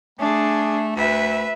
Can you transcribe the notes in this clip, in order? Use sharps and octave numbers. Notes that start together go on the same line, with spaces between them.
A3 D4 G#4
D2 B4 E5